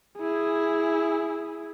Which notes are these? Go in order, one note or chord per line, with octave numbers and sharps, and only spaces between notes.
E4 G#4